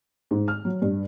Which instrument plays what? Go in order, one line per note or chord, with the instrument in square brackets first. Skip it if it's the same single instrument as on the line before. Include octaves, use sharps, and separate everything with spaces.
[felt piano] G#2
F6
F#3
G2